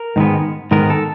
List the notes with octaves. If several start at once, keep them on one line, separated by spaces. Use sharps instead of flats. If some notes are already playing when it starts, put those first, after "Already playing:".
Already playing: A#4
G#2 D#3 G#3 B3
G#2 D#3 G#3 B3 A#4
A4